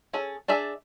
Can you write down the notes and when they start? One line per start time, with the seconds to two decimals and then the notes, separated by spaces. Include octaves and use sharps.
0.13 C#4 G#4 A4
0.48 D4 G#4 D5 E5